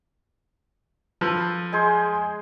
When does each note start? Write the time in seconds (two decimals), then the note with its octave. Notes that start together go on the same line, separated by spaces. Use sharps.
1.21 F3 A4 B4
1.73 G#3 G#4 C5